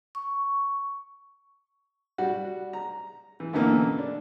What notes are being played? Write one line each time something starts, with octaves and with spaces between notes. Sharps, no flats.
C#6
G3 F#4
A#5
E3
F#2 B2 D3 E3 A#3
D4